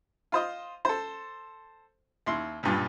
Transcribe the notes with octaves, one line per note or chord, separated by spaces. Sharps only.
F4 C5 D#5
A4 C5
D#2 E4 C6
B1 G2 A#2